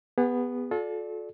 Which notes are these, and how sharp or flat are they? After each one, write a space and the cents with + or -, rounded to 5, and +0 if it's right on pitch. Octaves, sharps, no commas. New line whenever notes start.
B3 +0 G#4 -40
F4 +40 A4 -30 D5 +0